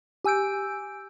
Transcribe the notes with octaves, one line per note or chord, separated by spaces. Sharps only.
G4 G#5 E6 G6 D7